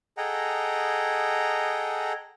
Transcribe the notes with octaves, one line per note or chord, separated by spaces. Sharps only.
G#4 A4 D#5 F#5 G5 A#5